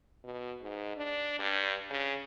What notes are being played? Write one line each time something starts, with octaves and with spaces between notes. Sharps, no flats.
B2
G#2
D4
G2
C#3